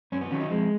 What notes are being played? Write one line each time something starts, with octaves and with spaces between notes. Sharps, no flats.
F#2 C#4
B3
D#3 F#3 C#4
D#4
F2 G#3